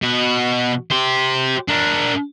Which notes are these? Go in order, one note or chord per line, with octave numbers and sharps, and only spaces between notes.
B2 F#4
G4 C5
D4 A#4